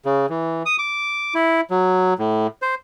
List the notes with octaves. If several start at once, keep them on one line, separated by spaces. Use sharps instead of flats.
C#3
E3
D#6
D6
E4
F#3
A2
C5